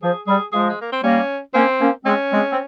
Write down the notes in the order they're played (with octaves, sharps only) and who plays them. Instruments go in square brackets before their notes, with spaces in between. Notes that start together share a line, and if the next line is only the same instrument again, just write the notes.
[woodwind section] F3 [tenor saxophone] G#4
[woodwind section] G3 [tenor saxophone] G#4
[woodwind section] F3 G#3 [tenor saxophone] G#4
[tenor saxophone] G#3
A#3
C4
[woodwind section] G3 A#3 [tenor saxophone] C#4
[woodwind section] A#3 C#4 [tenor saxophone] C4
[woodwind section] A#3 C#4
[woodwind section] G#3 C4 [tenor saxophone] C#4
[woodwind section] G#3 C4
C4